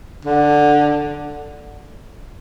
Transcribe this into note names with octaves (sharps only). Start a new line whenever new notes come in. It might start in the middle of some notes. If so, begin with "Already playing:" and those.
D3